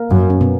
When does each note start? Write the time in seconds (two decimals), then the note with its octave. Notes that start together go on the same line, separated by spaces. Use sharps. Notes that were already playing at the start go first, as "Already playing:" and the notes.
Already playing: A#3 A#4
0.11 F#2
0.30 C#4
0.41 B2 B3